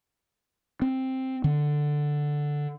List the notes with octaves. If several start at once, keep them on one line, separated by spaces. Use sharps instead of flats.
C4
D3